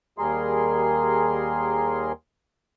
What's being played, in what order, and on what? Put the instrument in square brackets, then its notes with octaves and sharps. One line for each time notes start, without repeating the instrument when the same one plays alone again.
[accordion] D#2 G3 G#4 A#4 C6